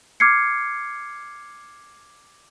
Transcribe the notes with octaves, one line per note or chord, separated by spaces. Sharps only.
D6 F6 G#6 C7 C#7